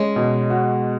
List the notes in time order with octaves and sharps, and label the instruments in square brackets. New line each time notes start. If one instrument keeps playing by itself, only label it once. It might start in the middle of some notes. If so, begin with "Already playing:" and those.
Already playing: [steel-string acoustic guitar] G#3 [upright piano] C#4
[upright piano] B2
F#4